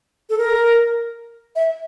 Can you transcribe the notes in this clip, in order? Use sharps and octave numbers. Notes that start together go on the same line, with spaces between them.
A4
A#4
E5